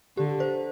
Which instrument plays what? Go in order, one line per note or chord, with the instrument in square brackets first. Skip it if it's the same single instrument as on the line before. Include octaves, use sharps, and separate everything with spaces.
[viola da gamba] D3 [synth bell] G4
[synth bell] C5